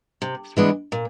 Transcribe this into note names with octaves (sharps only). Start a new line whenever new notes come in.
C3
E3 G#3 B3 D4
A#2